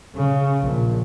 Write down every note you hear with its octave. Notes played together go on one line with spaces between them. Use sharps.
C#3
A#1